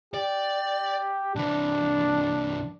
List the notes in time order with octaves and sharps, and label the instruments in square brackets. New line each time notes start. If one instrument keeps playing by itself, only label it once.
[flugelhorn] G4 [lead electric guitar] D5
[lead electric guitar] C2 E3 [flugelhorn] D4